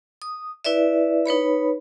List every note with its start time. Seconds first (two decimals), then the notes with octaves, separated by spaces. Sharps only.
0.22 D#6
0.65 E4 B4 D5 E5
1.26 D#4 B4 C#5 B5